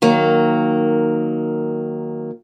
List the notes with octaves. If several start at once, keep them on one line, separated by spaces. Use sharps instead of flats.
D#3 F#3 A#3